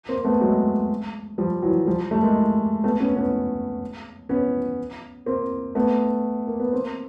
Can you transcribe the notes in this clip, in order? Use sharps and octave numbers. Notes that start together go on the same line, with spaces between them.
A#3 C4
A3 B3
F#3 G#3
F3 G3
E3 F#3
F3 G3
G3 A3
G#3 A#3
A3 B3
B3 C#4
B3 C#4
B3 C#4
A#3 C4
A3 B3
A#3
B3
A#3 C4